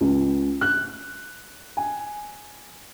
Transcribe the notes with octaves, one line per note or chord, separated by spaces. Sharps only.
C#2
F#6
G#5